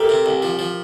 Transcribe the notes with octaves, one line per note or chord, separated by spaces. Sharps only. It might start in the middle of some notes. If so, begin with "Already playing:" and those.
Already playing: A3 G4 A#4
C3
C2
F3
F3